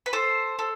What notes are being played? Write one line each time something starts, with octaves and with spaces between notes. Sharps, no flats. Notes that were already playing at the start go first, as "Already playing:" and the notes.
B4
A4 C5
A4